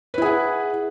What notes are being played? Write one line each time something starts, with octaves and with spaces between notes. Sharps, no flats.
E4 G#4 B4 F#5